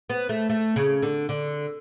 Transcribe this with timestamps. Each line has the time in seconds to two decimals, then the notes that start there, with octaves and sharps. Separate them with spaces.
0.10 B3
0.29 A3
0.50 A3
0.76 C#3
1.03 D3
1.29 D3